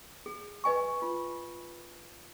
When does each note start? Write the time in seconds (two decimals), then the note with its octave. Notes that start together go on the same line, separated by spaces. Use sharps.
0.26 G#4
0.64 B4 D#5 G#5 C#6
1.02 F4